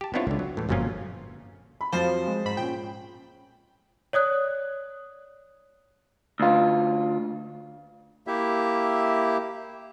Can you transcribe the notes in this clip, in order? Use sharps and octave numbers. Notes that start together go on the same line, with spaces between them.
G4 A5
B3 C4 D4 E4 F4 C#5
C#2 D3
F#3
A2 E3
G1 F#2 A#2 F3 C#4 F4
B5
F2 F3 F#3 C5 A6
G#3
G#2 B5
A#2 C#4 G5
C#5 D5 D#6 F#6
D2 F4
A#3 E4 G4 E5